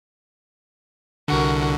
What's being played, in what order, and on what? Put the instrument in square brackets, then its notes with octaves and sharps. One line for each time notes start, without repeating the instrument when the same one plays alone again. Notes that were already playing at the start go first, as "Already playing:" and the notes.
[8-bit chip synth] C2 D3 [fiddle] F#4 A#4